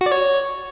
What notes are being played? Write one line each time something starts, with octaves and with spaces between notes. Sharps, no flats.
F#4
D5
C#5